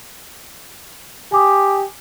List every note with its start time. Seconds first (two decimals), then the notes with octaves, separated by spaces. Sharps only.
1.32 G4 G#5 D6 D#6